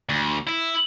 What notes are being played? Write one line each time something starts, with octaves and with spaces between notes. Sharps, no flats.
D2
E4